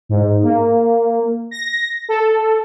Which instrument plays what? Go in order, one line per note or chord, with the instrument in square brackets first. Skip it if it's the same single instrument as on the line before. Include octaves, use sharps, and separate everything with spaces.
[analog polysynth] G#2
A#3
A#6
A4